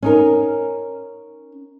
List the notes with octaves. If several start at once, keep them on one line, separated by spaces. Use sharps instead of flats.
C#4 D#4 A#4